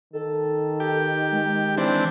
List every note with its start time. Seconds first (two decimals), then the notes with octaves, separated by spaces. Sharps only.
0.13 D#3 A4
0.80 G4
1.31 G#3
1.78 E3 C4 D4